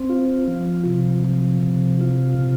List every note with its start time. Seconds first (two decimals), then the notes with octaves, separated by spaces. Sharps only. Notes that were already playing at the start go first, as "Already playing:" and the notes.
Already playing: C4
0.09 F4
0.48 F3
0.86 C3
1.24 F3
1.63 C3
2.01 F4
2.38 C3